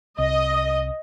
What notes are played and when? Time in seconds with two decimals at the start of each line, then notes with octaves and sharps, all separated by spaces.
0.19 C2 D#5